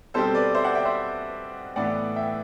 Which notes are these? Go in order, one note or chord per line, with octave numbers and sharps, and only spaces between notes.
B2 G3 C4 A4 C5
B4 D5
C5 E5
D5 F#5
E5 G5
C5 E5
A2 E3 B3 D5 F#5
E5 G5